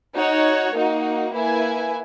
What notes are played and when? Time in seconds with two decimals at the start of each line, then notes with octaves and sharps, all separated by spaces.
0.15 D#4 F#4 C#5
0.74 A#3 D#4 F#4
1.33 A#3 E4 B4 E5 G#5